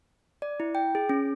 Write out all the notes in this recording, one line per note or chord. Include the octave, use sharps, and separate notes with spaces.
D5
E4
G5
G#4
C#4